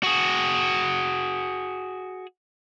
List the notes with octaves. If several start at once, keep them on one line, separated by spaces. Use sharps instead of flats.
F#4 G#4